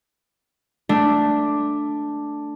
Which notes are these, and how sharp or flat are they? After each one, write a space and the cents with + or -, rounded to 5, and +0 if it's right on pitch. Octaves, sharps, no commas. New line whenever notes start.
A3 +0 D4 +0